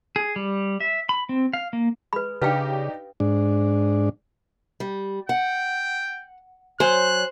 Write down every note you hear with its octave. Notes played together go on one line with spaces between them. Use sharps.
G#4
G3
E5
B5
C4
F5
A#3
G#3 B4 B5
C#3 D4 D#4 G4 B4 F5 G5
G#2 D4
G3
F#5 G5
F#3 C5 C#5 G#5 F#6